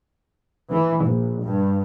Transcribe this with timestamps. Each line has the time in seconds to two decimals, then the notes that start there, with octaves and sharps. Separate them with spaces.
0.70 E3
1.04 A#1
1.42 G2